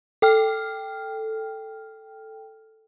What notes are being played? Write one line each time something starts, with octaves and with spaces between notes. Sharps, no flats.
A4 G5 F6